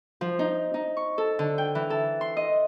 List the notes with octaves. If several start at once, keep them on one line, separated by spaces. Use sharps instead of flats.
F3
D#4
D#4
C#6
A4
D3
G5
E3
A4
C6
D#5